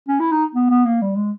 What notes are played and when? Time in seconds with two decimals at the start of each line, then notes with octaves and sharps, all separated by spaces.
0.08 C#4
0.20 E4
0.32 D#4
0.55 B3
0.70 B3
0.85 A#3
1.02 G3
1.16 G#3